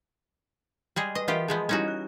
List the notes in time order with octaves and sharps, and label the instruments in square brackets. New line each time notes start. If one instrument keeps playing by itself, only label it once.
[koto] G3 G#3 G#4
[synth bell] B4 [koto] D#5
[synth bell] E3 A#4 E5 [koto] B3 F4 G4
[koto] F3 G#3 B3 [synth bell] G#4 G6
[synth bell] G3 E4 G4 [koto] C#4 D#4 F#4
[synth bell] F#6